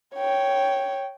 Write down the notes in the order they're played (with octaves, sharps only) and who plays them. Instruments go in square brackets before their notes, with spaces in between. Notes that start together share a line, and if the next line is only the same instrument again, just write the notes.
[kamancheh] C#5 G5